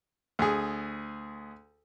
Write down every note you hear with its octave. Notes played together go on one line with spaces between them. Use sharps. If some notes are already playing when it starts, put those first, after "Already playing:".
D2 G#4